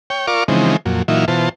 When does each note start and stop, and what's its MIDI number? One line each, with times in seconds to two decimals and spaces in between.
0.10 0.26 73
0.10 0.26 79
0.27 0.44 65
0.27 0.44 70
0.27 0.44 74
0.27 0.44 77
0.27 0.44 85
0.27 0.44 86
0.48 0.77 49
0.48 0.77 52
0.48 0.77 53
0.48 0.77 56
0.48 0.77 60
0.48 0.77 63
0.86 1.03 41
0.86 1.03 46
0.86 1.03 54
1.08 1.25 46
1.08 1.25 52
1.08 1.25 54
1.08 1.25 63
1.08 1.25 65
1.08 1.25 76
1.28 1.49 47
1.28 1.49 52
1.28 1.49 65
1.28 1.49 72
1.28 1.49 81